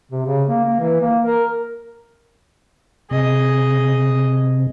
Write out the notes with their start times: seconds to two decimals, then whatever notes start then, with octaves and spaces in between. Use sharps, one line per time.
0.12 C3
0.26 C#3
0.49 A#3
0.64 A#3
0.80 E3
1.01 A#3
1.25 A#4
3.11 C3 G#4 D#5